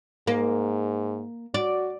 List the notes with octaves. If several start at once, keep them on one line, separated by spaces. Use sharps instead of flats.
G#2 A#3
F#4 D5